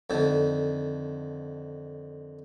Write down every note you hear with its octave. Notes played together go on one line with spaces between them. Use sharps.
F2 D3 D#3